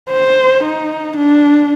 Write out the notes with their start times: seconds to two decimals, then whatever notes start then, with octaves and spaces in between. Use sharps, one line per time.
0.10 C5
0.64 D#4
1.16 D4